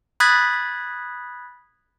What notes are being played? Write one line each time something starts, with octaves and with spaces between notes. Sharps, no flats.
B5 D#6 F#6 G#6 A6 B6